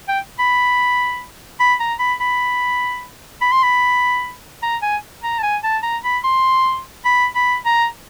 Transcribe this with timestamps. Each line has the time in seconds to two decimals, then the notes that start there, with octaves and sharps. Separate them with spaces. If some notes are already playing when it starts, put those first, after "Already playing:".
0.08 G5
0.39 B5
1.60 B5
1.79 A#5
1.99 B5
2.20 B5
3.41 B5
3.52 C6
3.63 B5
4.62 A#5
4.82 G#5
5.23 A#5
5.39 A5
5.43 G#5
5.63 A5
5.83 A#5
6.04 B5
6.24 C6
7.05 B5
7.35 B5
7.65 A#5